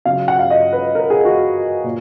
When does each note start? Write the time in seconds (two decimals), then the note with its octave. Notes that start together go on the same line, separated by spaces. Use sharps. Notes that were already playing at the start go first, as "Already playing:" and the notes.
0.05 C#3 F#3 F5
0.28 F#5
0.39 F5
0.50 D#5
0.73 B4
0.95 A#4
1.10 G#4
1.25 F#4
1.84 A#2